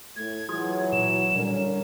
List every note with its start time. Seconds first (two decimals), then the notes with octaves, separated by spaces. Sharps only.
0.16 A2 G#6
0.49 E3 F#3 F4 G#4
0.92 A#2 E7
1.36 D3 G3 C#4 A#4